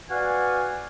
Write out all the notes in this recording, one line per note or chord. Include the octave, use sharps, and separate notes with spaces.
F#4 B4 D5 F5 F#5 G#5